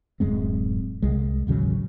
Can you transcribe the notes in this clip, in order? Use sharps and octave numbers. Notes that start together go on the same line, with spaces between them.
D1 F#2 G#3 C4
C2 G#3
A1 D#2 C#3 F#3